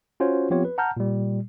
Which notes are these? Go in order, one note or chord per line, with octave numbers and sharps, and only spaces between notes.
C#4 F4 F#4 C5 C#5
F3 B3 C4 F4 G4 C#5
B4
F#5 A5 A#5 F6 G6
A#2 G3